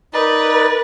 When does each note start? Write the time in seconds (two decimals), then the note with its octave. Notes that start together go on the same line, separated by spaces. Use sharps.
0.13 D#4 A#4 B4 D5